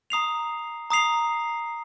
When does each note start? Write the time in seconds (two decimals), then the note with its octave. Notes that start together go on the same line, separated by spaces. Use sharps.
0.10 A#5 D#6 C7 F7
0.90 A#5 D#6 C7 F7